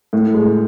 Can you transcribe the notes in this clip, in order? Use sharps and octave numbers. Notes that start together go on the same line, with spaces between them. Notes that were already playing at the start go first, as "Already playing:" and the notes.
A2
G#3